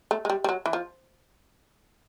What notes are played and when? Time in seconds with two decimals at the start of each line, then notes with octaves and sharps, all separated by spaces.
0.11 A3
0.25 G#3
0.30 G3
0.44 G3
0.49 F#3
0.66 E3
0.73 F3